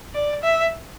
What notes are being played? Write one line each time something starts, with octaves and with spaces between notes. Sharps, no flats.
D5
E5